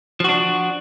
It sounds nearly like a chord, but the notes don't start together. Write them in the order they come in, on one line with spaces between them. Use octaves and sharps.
F3 F#4 D4